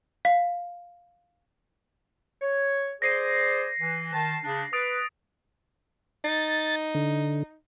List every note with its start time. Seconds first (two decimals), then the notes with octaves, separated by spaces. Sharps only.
0.25 F5
2.41 C#5
3.02 G#4 C5 D5 A#6 C7 D#7
3.80 E3
4.13 D#3 A5
4.44 C#3 D4
4.73 B4 D#6 A6 D7
6.24 D#4 A6
6.95 D3